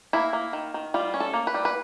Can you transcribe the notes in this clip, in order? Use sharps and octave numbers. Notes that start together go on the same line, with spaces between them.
A#3 E4
A#3
D#3
D#3
G3 F4
C#4
A4
A#3
B4
G3
B4